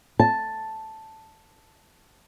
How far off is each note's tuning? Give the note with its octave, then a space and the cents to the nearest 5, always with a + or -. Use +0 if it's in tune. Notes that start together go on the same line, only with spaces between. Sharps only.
A5 +0